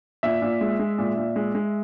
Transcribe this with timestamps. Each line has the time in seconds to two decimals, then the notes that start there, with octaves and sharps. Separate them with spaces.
0.23 A#2 E5
0.42 A#2
0.61 G#3
0.79 G#3
0.98 A#2
1.17 A#2
1.36 G#3
1.55 G#3